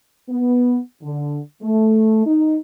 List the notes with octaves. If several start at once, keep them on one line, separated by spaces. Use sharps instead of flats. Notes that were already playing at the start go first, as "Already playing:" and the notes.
B3
D3
A3
D#4